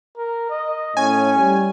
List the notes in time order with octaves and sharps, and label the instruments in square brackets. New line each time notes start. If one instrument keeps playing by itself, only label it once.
[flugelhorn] A#4
D#5
[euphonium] A2 [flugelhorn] C#4 [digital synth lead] G#5
[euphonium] G3